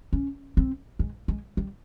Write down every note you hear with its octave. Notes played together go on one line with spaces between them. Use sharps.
C#4
C4
G#3
G#3
G3